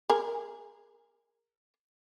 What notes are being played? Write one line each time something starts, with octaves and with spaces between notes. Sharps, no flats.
G#4 A#4